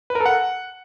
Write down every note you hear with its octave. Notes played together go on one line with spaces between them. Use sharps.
B4
A#4
A4
F#5